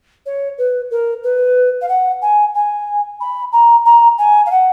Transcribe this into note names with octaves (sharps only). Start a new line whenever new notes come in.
C#5
B4
A#4
B4
F5
F#5
G#5
G#5
B5
A#5
A#5
G#5
F5
F#5